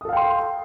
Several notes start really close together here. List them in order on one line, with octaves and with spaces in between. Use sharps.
D#6 A4 F5 G5 C6